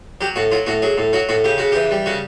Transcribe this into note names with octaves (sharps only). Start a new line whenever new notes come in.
F#3 G4
A2 F#4
F#3 F4
A2 F#4
F#3 G#4
A2
F#3 F#4
A2 F#4
C#3 G4
C#3 F#4
E3 G4
G3
C#3 F#4